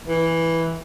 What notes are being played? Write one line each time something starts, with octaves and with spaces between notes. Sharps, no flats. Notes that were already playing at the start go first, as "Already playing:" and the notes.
E3